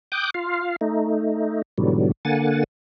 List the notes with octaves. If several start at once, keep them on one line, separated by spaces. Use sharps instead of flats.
G5 D6 D#6 F#6 G6
F4 F5
A3 D#4
G#2 B2 D3 E3 F#3 G3
D3 A#3 F#5 G#5 A6